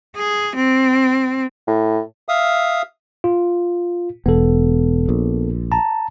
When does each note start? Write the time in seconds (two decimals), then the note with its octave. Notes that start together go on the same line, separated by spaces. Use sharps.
0.16 G#4
0.56 C4
1.68 A2
2.29 E5 F5 D#6
3.24 F4
4.26 E1 B3 A4
5.09 A#1
5.72 A5 A#5